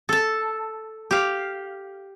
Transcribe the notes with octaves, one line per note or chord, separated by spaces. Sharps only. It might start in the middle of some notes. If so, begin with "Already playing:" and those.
A4 A5
G4 F5